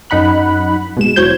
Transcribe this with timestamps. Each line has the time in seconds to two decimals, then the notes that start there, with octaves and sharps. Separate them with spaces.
0.10 F#2 D#4 F#5 B5 F#6
0.97 B2 G#3 E7
1.16 E2 F#3 C5 C#5 G6 G#6